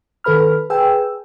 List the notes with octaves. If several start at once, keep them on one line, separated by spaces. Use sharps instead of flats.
D#3 A4 B4 B5 F6
G#4 B4 G5 G#5 E6